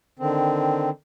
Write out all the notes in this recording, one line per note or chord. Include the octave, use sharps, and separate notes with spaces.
D3 D#3 C4